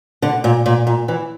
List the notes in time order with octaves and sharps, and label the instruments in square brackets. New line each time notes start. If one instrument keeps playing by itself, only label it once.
[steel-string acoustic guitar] D3
A#2
A#2
A#2
E3